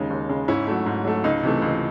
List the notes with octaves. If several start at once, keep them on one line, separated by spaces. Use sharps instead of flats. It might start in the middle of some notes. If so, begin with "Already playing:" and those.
Already playing: D#2 C#3 G#3 D#4
D#2
C#3 G#3
G#2 C#4 E4
F#3 A3
G#2
F#3 A3
C#2 D#4
C3 E3 A3
C#2